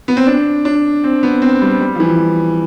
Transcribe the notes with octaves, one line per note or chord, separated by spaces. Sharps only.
B3
C4
D4
D4
C4
B3
C4
G3
G3
F3
E3